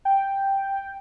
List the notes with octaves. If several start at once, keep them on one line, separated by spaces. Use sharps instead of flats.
G5